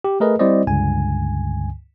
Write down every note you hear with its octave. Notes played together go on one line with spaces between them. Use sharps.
G4
A3 G#4 A#4 B4 D#5
G3 C4 E4 C5 D5 D#5
C#2 G2 D3 G#5